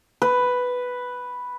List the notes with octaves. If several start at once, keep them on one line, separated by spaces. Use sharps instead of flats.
B4